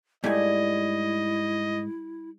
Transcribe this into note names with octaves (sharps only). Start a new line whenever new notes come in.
G#2 G3 A3 E4 D#5 G#5